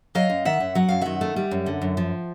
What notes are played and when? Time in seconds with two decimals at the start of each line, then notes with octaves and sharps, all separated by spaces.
0.15 F#3 D#5 F5
0.30 F#2
0.45 D#3 E5 F#5
0.60 F#2
0.75 F#3 F#5
0.89 F#2 F5
1.01 D#3 E5 F#5
1.21 A3
1.36 G3
1.51 F#2
1.66 D3
1.82 F#2
1.97 F3